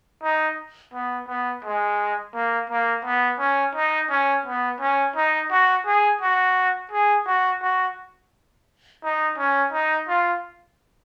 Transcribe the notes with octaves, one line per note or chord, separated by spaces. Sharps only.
D#4
B3
B3
G#3
A#3
A#3
B3
C#4
D#4
C#4
B3
C#4
D#4
F#4
G#4
F#4
G#4
F#4
F#4
D#4
C#4
D#4
F4